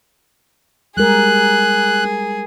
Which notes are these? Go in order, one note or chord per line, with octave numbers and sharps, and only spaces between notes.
G3 G#3 G#4 A#4 F#6